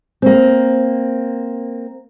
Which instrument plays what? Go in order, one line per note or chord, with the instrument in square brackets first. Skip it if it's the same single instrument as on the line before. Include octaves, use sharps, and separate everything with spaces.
[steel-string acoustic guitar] A#3 C4